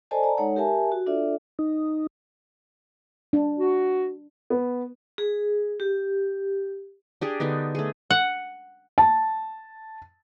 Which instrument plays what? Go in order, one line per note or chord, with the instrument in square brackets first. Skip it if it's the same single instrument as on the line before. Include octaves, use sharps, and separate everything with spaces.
[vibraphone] A4 C5 D5 D#5 G#5 A5
D5 A5 A#5
G#3 D#4 A4 C#5 F#5
G4 A#4 E5 G#5 A5
F#4
D4 F4 A4 D5 E5
[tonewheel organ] D#4
[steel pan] D4
[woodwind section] F#4
[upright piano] B3
[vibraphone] G#4
G4
[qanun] D4 G4 G#4
D3 B3 D4 D#4
A3 G#4
[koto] F#5
[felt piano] A5